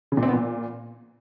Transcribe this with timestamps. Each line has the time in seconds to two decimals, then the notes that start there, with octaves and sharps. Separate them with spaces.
0.12 C#3
0.17 A#2
0.23 C4
0.28 B3
0.33 A#2